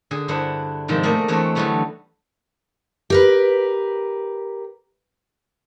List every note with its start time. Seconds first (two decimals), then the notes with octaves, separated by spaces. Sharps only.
0.11 D3 G#4
0.28 G2 D3 D4 E4 C5 F#5
0.88 G#2 C3 D#3 F3 G#3
1.03 A3 A#3 G#4 A#4 D5 E5
1.28 E2 G#3 A3 C4 D4 C#5
1.55 D3 E3 F#3 G3 A3 B3
3.10 G4 A#4 B4